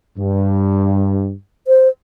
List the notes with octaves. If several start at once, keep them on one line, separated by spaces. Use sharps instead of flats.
G2
C5